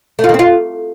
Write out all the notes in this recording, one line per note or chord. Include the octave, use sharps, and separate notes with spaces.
A3
F4
D#3
C4
F4